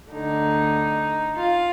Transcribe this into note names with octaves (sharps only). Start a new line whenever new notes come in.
D2 D3 D#4
F4